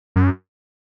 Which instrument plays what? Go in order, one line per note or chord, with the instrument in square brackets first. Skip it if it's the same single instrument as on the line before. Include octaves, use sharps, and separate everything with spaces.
[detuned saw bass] F#2